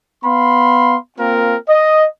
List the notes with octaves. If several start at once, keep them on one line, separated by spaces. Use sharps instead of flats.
B3 F5 B5 C6
A#3 C4 F4 A#4
D#5